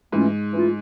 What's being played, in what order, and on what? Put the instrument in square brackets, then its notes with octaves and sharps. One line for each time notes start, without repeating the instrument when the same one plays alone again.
[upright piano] G#2 [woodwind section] E3 A3 C#4 F4
[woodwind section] E3 A3 C#4 F4